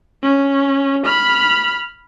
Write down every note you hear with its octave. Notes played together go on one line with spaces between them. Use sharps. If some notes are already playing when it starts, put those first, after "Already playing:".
C#4
B5 F6